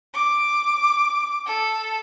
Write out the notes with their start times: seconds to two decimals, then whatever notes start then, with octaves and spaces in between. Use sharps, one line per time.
0.13 D6
1.46 A4